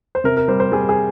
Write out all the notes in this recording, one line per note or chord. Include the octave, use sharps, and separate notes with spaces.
C5
C3 A#4
A#4
G3 C5
C5
G3 G#4
G#4